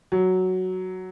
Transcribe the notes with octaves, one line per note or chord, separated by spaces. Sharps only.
F#3